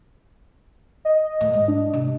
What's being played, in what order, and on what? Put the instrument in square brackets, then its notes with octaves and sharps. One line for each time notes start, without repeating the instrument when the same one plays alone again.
[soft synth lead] D#5
[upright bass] A#1 A2
G#2
[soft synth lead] D4
[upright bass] C3 A3